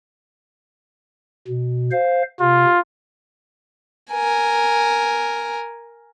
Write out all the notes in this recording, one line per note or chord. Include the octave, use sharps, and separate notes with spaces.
B2
C5 F5
C3 F4
A#4 G#5